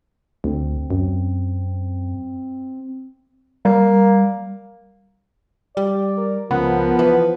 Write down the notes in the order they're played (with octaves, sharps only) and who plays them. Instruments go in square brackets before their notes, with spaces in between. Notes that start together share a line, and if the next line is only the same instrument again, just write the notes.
[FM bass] D2 [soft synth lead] C4
[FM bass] F#2
[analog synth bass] G3 [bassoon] A#3
[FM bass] G3 [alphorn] G4 [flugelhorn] D5
[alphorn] A#4
[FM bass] C#2 [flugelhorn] F3 [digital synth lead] B3 [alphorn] A#4
[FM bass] E3 [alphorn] B4